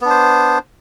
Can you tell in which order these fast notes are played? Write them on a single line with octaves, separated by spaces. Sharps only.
B3 D4 C5